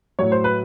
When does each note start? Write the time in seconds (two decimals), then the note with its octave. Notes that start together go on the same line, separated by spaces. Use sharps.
0.19 A2 F#3 C#5
0.32 C5
0.44 B4